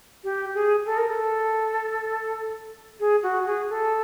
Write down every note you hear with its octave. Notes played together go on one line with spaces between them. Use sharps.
G4
G#4
A4
A#4
A4
G#4
F#4
G#4
A4